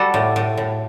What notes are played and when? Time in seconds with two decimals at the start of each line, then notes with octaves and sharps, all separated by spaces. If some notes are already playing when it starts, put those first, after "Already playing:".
Already playing: G3 F#4 A4
0.14 A2
0.36 A2
0.57 A2